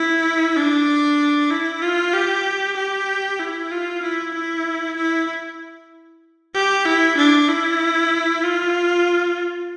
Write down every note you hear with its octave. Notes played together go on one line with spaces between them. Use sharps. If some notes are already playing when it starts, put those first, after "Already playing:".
Already playing: E4
D4
E4
F4
G4
G4
E4
F4
E4
E4
E4
G4
E4
D4
E4
F4